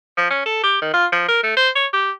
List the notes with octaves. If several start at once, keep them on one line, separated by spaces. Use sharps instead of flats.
F3
C#4
A4
G4
D#3
F4
F3
A#4
A3
C5
C#5
G4